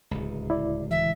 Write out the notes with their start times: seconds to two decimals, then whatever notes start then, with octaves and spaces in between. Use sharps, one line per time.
0.11 D1 C#2
0.50 E4 D5
0.91 E3 E5